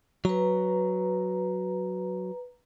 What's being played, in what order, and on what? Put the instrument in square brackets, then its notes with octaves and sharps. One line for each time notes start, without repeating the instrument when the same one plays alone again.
[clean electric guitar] F#3 [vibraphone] B4 A#5